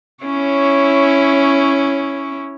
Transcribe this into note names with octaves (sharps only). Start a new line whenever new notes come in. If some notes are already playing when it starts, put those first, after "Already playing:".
C#4 E4 C#5